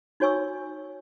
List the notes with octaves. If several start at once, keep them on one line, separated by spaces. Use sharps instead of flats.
D#4 F#4 C#5 G#5 C#6 E6